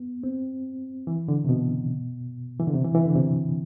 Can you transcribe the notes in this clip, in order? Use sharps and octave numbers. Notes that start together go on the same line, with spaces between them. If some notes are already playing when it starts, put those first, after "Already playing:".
Already playing: B3
C4
E3
D3
C3
B2
E3
D3
C3
E3
E3
D3
C3